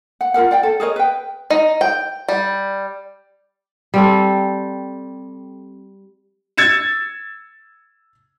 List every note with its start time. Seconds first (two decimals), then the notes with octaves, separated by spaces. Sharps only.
0.21 F#5
0.34 F4 G#4 A#4 F#5
0.51 D5 F#5 G5
0.63 A4
0.80 G#4 A#4 C#5 D#5
0.96 B4 G5
1.50 D#4
1.81 G5
2.29 G3
3.94 G3 C4 A4
6.57 E6 G#6 A6 C#7 E7